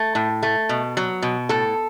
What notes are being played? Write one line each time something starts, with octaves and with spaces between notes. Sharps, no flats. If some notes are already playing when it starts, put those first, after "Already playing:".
Already playing: A3
A2
A3
B2
F#3
B2
A2 A4